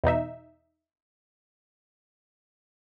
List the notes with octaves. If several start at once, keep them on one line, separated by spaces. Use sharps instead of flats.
E2 B2 D#4 E5